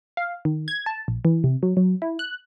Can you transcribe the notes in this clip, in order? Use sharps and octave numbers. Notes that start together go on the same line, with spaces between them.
F5
D#3
G#6
A5
A#1
E3
C3
F#3
F#3
E4
F#6